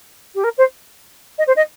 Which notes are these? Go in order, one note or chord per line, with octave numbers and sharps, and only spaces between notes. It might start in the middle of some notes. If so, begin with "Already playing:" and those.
G4
A#4
C5
D#5
C5
D#5